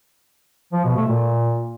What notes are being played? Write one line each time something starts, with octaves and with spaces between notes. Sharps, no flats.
F3
B2
A3
A#2